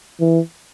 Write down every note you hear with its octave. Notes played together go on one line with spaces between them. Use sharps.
E3